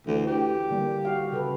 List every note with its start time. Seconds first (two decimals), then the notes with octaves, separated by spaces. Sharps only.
0.07 D2 E3
0.27 G4
0.70 D3 G3 A#3
1.05 F#4 F5
1.32 C#3 A4 B4